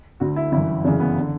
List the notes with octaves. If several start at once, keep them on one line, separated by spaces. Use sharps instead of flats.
D2 D3 F#4
E4
G1 F#2 E3 E4
G1 F#2 C#3 E3 D4
B3
D3